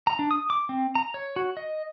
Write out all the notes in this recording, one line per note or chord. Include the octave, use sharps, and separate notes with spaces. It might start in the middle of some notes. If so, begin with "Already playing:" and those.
A#5
D4
D#6
D6
C4
A#5
C#5
F#4
D#5